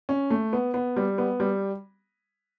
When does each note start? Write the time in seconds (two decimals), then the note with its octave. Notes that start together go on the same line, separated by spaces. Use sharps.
0.09 C#4
0.30 A3
0.53 B3
0.74 B3
0.96 G3
1.18 B3
1.40 G3